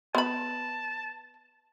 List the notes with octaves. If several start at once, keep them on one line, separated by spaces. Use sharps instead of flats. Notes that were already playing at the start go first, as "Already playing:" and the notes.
B3 A5 B5